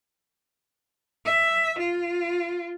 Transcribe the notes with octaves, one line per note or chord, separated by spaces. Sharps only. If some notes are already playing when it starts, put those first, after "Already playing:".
E5
F4